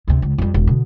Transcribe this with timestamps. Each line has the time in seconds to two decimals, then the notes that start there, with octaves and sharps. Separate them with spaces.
0.08 D2 C3
0.22 C#2
0.38 F2 G3
0.54 E1
0.67 B2 D3